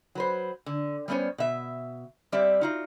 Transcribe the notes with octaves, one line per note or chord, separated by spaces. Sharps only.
F#3 B4 C5
D3
G3 A3 B3 C#4 C5 C#5
B2 E5
G3 C4 G4 D5 E5
D#4 F4 F#4